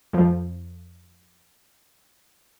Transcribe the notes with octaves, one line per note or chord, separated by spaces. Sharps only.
F2 F3